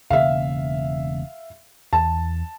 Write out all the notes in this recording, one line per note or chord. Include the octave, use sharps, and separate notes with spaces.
E1 C#3 A#3 E5 F5
E2 A5